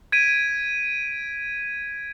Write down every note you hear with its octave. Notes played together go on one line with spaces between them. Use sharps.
G#6 B6 D7 D#7